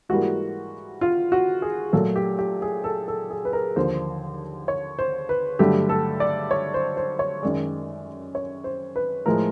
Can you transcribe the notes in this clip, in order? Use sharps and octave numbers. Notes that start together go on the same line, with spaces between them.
G#2 E3 G3 A#3 F#4
F4
F#4
G#4
A#2 F#3 A3 A4
G4
G4
G#4
A4
A4
G#4
B4
A#4
D#2 D3 F3 A#3 C5
C#5
C5
B4
G2 D3 F#3 A3 G4
A4
D5
C#5
C5
C5
C#5
F#2 D#3 G#3 D5
C#5
C5
B4
A2 F3 G#3 A#4